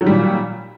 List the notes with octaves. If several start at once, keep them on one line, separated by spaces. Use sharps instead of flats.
A#2 D#3 F#3 G3